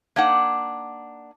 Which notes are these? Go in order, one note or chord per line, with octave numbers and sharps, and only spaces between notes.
A#3 D4 D#4 F#5